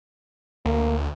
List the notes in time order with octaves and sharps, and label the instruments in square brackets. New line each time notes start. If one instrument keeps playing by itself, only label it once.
[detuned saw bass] D2 [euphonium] A#3